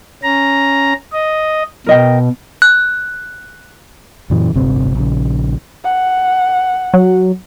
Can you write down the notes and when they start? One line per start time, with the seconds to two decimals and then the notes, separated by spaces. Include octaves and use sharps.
0.23 C#4 A#5
1.13 D#5
1.86 B2 A#4 D#5 G5
2.62 F#6
4.30 F#2 A#2 C#3 E3
4.53 D1 G1 C3 C4
4.95 A#1 C#3
5.84 F#5
6.94 F#3